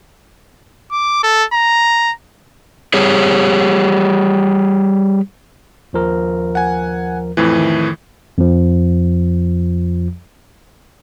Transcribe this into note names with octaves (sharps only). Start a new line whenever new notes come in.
D6
A4
A#5
G3 G4 G#4 C#5
D#2 F3 A#4
F#5 G#5
F2 A2 E3
D#3
F2 F3